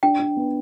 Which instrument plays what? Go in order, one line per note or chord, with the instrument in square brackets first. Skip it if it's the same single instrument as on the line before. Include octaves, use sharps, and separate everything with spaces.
[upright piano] D4 [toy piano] G5
[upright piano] D4
B3